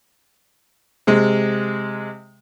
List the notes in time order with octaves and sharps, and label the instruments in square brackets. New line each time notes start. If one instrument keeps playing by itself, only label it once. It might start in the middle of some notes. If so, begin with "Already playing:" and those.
[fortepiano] C3 G#3